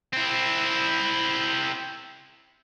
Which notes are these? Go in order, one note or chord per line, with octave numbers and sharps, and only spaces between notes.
C4 E4